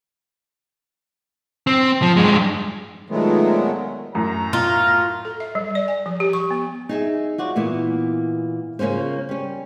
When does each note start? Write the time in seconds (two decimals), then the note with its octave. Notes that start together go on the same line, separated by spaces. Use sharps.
1.67 C4
2.02 F3
2.16 G2 G#3
3.10 A#2 D#3 F#3 G#3 A3 B3
4.15 F#2 A2 A#5
4.53 F4
5.25 A4
5.40 E5
5.55 G3
5.75 D5
5.88 G#5
6.06 F3
6.20 G4
6.33 C#6
6.51 B3
6.89 D#4 G#4 E5
7.38 F4 F#4 D5
7.56 A#2 E3 A#3 B3
8.79 C#3 A#3 C#4 F4 C5
9.29 G3 C#4